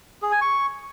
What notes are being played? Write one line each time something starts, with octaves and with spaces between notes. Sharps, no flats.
G#4
G#5
C#6